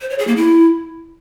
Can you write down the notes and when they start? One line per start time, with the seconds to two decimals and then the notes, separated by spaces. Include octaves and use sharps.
0.01 C5
0.10 C#5
0.19 G#4
0.27 A#3
0.36 E4